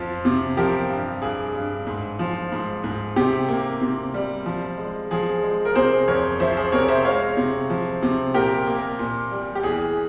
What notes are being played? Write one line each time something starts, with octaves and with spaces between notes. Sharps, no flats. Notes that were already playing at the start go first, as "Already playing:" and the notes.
Already playing: F2 F3
C3
F3 G4 A#4
G2
G2 G#4
G2
G#2
F3
G#2
G#2
C3 G4
A#3
C3
G3
F3
G#3
F3 G#4
G#3
A#4
C3 G#4 C5
F2 A#4 C#5
F3 C5 E5
G#4 C5
C3 A#4 C#5
C5 E5
G#3 C#5 F5
C3
F3
C3
A#2 G4 A#4
A#3
A#2
G3
G4
E2 G#4